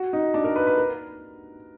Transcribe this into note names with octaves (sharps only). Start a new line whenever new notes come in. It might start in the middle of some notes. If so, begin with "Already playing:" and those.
Already playing: F#4
D#4
D4
A#4
B4
B4
A#4